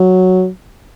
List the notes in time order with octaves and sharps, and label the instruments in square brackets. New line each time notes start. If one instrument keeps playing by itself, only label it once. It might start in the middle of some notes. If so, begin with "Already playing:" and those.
Already playing: [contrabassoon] F#3